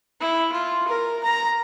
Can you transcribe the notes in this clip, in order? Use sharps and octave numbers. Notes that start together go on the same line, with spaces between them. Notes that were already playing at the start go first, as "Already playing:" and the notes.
E4
F4
A#4
A#5